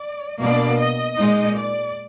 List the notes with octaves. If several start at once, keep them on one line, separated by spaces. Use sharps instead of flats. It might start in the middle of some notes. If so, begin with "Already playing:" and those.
Already playing: D5
B2 A#3 D4 D5
D#5
A#2 G#3 D#4
D5